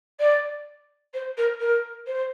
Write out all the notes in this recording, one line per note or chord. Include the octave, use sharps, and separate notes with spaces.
D5
C5
A#4
A#4
C5